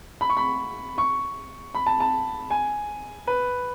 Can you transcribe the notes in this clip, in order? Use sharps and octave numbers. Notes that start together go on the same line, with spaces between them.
B5
C#6
B5
C#6
B5
A5
A5
G#5
B4